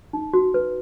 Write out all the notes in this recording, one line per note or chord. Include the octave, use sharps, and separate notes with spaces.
D#4
F#4
B4